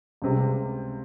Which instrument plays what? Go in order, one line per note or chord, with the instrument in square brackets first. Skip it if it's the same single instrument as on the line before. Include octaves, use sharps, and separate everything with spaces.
[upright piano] C#2 C3 G3